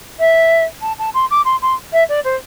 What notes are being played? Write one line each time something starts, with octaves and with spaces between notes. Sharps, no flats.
E5
A5
A5
C6
D6
C6
C6
E5
D5
C5